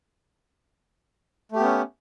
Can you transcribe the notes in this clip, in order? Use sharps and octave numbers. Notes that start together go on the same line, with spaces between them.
A3 B3 C#4 G4